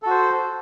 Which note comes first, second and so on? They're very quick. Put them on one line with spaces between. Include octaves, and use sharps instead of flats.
A4 F#4 C5